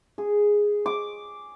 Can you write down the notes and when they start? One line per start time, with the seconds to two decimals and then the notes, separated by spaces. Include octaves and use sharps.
0.18 G#4
0.86 D6